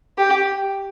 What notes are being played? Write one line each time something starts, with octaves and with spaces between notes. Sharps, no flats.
G4